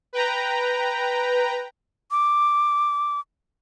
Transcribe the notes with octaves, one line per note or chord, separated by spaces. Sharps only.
B4 G5 A#5
D6